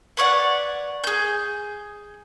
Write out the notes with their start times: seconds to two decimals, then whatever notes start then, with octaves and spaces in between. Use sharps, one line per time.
0.17 B4 C#5 D5 F#5
1.04 G#4 G6